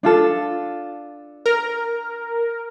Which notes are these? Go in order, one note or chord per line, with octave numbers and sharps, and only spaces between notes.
D4 F4 A4
A#4